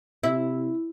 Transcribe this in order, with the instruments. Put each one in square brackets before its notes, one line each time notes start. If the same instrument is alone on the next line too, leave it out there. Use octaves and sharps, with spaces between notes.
[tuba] C3 [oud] E4